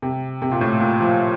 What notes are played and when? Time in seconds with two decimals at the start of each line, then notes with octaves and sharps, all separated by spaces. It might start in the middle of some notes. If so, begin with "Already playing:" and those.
0.02 C3
0.42 C3
0.52 A#2
0.61 A2
0.80 A#2
1.01 F3